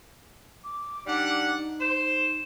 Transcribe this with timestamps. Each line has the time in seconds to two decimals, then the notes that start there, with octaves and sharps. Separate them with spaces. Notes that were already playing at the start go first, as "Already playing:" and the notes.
0.64 D6
1.07 G3 D4 D#4 F#5
1.81 C5 E7